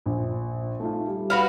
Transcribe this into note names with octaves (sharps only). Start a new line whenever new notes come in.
A#1
A3 D#4 F4
G3
F#4 B4 F5